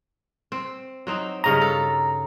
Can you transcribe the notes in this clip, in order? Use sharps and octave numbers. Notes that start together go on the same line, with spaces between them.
C4
F#3 C4 D#4
G2 C#3 D#5 A#5
A4